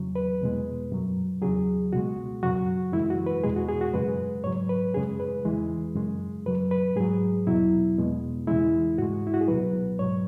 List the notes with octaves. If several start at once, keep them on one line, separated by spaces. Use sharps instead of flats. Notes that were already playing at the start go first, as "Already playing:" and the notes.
Already playing: E2 C#3 F#3
B4
E2 B2 G#3
F#2 F#3
E2 C#3 F#3 G#4
C#2 B2 G#3 F#4
F#2 C#3 F#3 F#4
F#2 E3 G#3 E4
F#4
B4
E2 B2 G#3 G#4
F#4
G#4
F#4
F#2 C#3 G#3 B4
G#2 F#3 C#5
B4
F#2 C#3 G#3 G#4
B4
E2 E3 G#3
F#2 C#3 G#3
F#2 F#3 B4
B4
G#2 F#3 G#4
E2 B2 F#3 E4
E2 B2 G#3
E2 C#3 E3 G#3 E4
G#2 G#3 F#4
E4
F#4
G#4
C#2 B2 F#3 B4
G#2 F#3 C#5